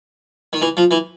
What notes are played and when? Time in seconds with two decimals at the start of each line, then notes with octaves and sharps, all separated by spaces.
0.53 D#3
0.62 E3
0.77 F3
0.91 E3